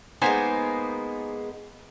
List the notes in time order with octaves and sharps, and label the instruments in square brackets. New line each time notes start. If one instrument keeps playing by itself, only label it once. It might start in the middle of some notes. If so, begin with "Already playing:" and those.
[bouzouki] G#3 A#3 B3 [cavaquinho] D#4 C5 G#5